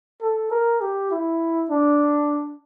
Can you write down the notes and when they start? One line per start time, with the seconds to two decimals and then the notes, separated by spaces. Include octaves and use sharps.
0.21 A4
0.51 A#4
0.81 G4
1.11 E4
1.70 D4